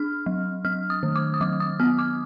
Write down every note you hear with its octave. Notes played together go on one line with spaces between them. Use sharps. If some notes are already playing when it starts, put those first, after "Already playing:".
Already playing: D4 F6
F#3
F#3 F6
D#6
D#3
D6
D#6
F#3 D6
D#6
B3 F6
D6